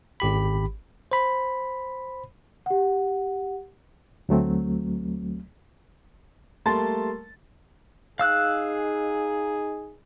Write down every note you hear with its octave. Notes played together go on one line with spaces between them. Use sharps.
G#1 G4 B5
C5 B5
G4 F#5
D2 F#3 A3 C4
G3 A3 A#3 A5 C6 A6
D#4 G#4 F5 E6 F#6